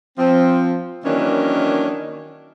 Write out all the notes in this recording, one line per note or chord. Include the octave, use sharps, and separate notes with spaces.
F3 C4
D#3 E3 F#3 A#3 C#4 D4